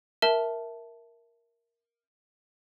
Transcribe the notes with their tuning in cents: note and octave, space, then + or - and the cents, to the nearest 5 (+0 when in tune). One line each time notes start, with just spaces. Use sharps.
A#4 +5 E5 +0 A5 +0